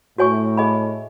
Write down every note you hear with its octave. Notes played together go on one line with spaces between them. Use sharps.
A2 F#4 C#5 G#5 C#6
G#4 D#5 G#5 B5